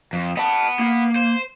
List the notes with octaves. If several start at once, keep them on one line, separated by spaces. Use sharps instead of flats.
F2
B3 D#5 A5
A#3
C5